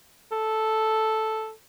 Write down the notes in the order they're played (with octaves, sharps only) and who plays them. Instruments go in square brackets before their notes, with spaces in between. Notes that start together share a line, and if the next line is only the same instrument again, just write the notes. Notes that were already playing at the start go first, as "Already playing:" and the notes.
[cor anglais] A4